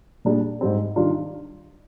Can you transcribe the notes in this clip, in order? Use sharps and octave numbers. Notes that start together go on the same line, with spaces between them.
A#2 G3 D4 G#4
G#2 G3 C4
D#3 G3 D4 F4